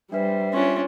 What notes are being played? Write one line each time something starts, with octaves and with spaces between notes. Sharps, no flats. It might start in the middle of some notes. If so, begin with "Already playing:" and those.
G3 D4 B4 C5 E5
C#4 D4 F4 C6